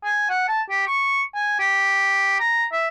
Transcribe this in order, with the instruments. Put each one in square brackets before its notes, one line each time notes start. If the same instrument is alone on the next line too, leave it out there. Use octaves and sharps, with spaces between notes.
[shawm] G#5
F#5
A5
G4
C#6
G#5
G4
A#5
E5